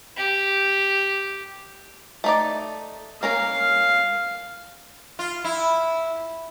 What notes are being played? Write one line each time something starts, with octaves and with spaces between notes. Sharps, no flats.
G4
A3 D#4 D5
A#3 C#4 A#4 F5
F4
E4